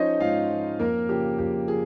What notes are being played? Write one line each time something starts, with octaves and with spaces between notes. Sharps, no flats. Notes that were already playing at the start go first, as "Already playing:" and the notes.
Already playing: F3 C#4 D#4 C5 C#5 D#5
G#2 F4 F5
F3
F2 A#3 A#4
C#3 F3 G4
F2 G4
F3 G#4